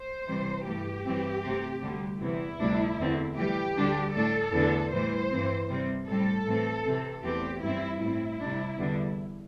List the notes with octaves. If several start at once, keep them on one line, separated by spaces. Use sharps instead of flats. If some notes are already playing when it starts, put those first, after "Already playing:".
Already playing: C5
C3 E3 G3
G2 E3 A3 G4
G2 E3 C4
C3 A3 C4
D2 D3 G3
E2 C3 E3 E4
D2 C3 G3 D4
E2 D3 C4
A2 E3 G3 G4
D2 D3 G3 D4
A2 A3 D4 A4
E2 D3 A3 D4
A2 E3 G3 C5
G2 E3 C4
C3 G3 C4
A2 G3 C4 A4
A2 E3 C4
C3 E3 C4
E2 E3 A3 C4 G4
G2 G3 C4 E4
A2 G3 C4 E4
C3 G3 D4
E2 D3 G3 D4